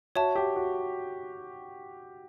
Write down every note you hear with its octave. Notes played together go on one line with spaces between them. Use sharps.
F#4 C#5 E5 A5
G4
F#4